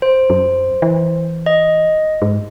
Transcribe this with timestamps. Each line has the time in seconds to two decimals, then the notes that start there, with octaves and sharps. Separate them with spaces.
0.02 C5
0.30 F#2
0.82 E3
1.46 D#5
2.22 G#2